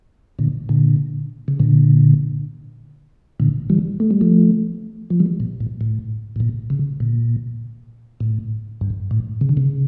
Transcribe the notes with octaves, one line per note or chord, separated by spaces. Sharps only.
A#2 D3
A#2 D3
C#3
A#2 D3
A#2 D3
E3 G3
A3
G3
F3 A3
F3
E3 G3
A#2
A2
A2
A2
A#2
C#3
A#2
A2
G2
A2
C#3
D3
C#3